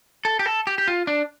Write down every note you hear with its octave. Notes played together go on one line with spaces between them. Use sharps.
A4
G4
A4
G4
G4
F4
D4